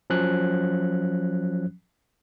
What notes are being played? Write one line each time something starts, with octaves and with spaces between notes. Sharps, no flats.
F3 F#3 C#4 F#6